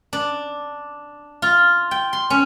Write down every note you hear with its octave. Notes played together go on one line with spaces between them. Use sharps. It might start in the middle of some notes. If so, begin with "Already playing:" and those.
D4
F4
G5
C6
C#4